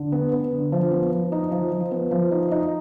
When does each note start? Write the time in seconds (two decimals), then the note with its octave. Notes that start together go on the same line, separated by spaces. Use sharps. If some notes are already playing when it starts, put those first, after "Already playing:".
Already playing: D3
0.12 B3
0.32 B3
0.52 D3
0.72 F3
0.91 B3
1.12 F3
1.32 D#4
1.51 F3
1.72 F3
1.91 B3
2.11 F3
2.31 D#4
2.51 D#4